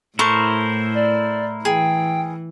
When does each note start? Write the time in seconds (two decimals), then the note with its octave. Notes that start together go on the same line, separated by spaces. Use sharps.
0.19 A2 E4 A4 A#4 C5 C#6
0.95 D5
1.65 E3 G#4 G5